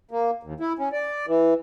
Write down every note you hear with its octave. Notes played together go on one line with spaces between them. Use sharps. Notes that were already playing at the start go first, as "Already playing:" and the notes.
A#3
D#2
E4
C#4
D5
E3